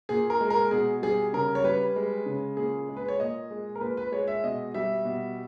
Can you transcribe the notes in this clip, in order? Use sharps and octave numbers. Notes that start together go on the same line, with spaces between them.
A#2 G#4
A#4
G#3
A#4
B2 G#4
G3 G#4
C#3 A#4
C#5
G3 B4
G#3
C#3
A#2 G#4
G#3
B4
C#5
A#2 D#5
G#3
A#4
A#2 B4
B4
G#3 C#5
E5
B2 D#5
G3 E5
B2